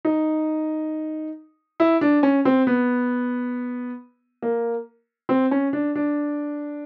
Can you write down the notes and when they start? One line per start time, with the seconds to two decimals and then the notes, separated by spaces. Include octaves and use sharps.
0.05 D#4
1.80 E4
2.01 D4
2.23 C#4
2.45 C4
2.67 B3
4.42 A#3
5.29 C4
5.51 C#4
5.73 D4
5.95 D4